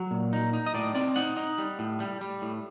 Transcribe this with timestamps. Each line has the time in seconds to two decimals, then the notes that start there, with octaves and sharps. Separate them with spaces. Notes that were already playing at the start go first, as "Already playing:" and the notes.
Already playing: F#3
0.11 A#2
0.33 D#4
0.53 D#4
0.66 D#5
0.74 A2 D5
0.95 C4 D5
1.16 D#4 F#5
1.37 D#4
1.58 G3
1.79 A2
2.00 G3
2.21 G3
2.42 A2